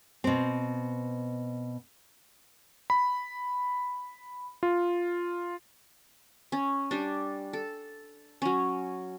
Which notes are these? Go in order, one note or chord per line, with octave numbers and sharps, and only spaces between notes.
B2 C4
B5
F4
C#4
G3 D4
A4
F#3 C#4